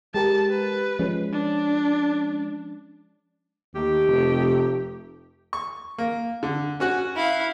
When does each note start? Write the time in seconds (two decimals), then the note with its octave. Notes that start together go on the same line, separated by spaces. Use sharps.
0.15 G#3 G4 A#4 A5
0.50 B4
0.99 F3 G#3 C#4
1.33 D4
3.74 D#2 A3 D#4 G4
4.07 F1
5.53 C#6
5.98 A#3
6.43 D3
6.80 C#4 F#4 F#5
7.15 E4 F5